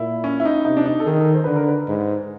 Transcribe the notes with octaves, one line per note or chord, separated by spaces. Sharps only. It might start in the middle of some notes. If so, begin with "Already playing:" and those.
Already playing: A#2 E4
C#4
E4
D#4
C3 D#4
D4
D#4
A4
D#3 G#4
A4
C5
D3 B4
A#4
B4
G#2